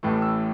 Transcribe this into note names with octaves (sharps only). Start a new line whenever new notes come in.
A1 A2 E3 A3
E6